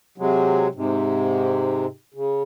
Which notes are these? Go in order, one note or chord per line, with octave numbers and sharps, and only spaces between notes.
C3 F#3 G#3
G#2 C3
C#3